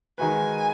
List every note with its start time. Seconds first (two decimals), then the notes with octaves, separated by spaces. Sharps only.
0.18 D#3 G#3 D#4 F#4 B4 G#5